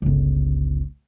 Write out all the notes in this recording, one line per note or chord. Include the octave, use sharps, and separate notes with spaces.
G1 C#2